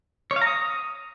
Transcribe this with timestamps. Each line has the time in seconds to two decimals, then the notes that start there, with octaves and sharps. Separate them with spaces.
0.31 C#5
0.36 F5
0.41 A#5
0.47 D#6